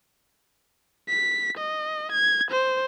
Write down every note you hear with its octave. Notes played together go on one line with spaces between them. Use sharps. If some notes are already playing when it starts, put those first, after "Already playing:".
B6
D#5
G#6
C5